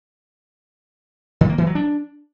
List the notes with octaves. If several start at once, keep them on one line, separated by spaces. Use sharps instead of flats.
D#3
A#3
E3
F#3
D4